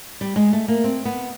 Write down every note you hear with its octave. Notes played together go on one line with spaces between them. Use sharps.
G3
G#3
A3
A#3
C4
B3